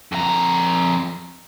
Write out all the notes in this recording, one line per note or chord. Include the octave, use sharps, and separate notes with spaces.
F2 A#5